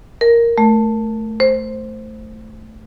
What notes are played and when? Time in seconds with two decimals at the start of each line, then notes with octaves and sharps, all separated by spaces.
0.21 A#4
0.58 A3
1.40 C5